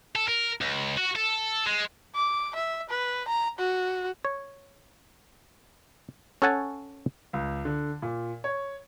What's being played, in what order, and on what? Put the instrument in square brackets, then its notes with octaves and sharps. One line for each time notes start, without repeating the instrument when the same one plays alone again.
[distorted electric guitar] A4
A#4
C#2
F#4
A4
G#3
[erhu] D6
E5
B4
A#5
F#4
[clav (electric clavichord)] C#5
C#4 A4 C#5 F#5 G#5 A5
[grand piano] C#2
D3
A#2
C#5